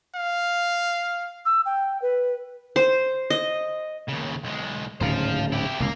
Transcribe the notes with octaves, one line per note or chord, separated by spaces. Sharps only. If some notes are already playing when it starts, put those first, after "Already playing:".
F5
E6
G5
B4
C5
D#5
D#2 C#3
B1 G#3
D1 G#2 C#3 C5 F5
E4 G4
E1 C#2 A#3 F5